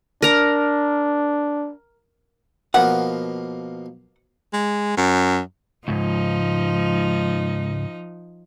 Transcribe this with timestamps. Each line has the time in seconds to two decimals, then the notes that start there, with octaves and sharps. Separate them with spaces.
0.22 D4 A#4 A#5
2.74 B2 F3 A#3 F#5
4.53 G#3
4.97 F#2
5.88 C#2 G#2 F3 D#4